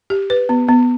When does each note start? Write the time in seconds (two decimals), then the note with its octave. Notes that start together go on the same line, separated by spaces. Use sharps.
0.10 G4
0.30 B4
0.49 B3
0.68 B3